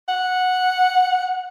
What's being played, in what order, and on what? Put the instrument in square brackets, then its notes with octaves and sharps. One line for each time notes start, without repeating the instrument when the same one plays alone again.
[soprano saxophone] F#5